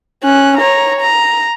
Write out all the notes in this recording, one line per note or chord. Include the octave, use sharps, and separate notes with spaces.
C#4 F#6
C#5 A#5
A#5